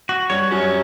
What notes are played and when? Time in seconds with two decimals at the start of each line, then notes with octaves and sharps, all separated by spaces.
0.09 F#4
0.29 G2 G3 C#5
0.51 F#2 F#3 C#4